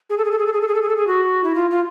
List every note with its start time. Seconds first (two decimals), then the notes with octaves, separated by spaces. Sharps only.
0.10 G#4
0.18 A4
0.25 G#4
0.31 A4
0.39 G#4
0.46 A4
0.53 G#4
0.61 A4
0.68 G#4
0.74 A4
0.82 G#4
0.89 A4
0.97 G#4
1.07 F#4
1.44 E4
1.55 F4
1.70 F4